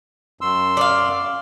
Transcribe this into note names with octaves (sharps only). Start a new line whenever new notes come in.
F#2 C6 E6
D5 F5